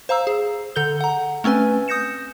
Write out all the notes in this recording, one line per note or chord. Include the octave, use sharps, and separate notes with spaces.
C5 F5 A#5 E6
G#4
D3 A4 G6 G7
F#5 A#5
A3 C4 C#4 B4 G#5
D#6 G6 A#6 C#7 E7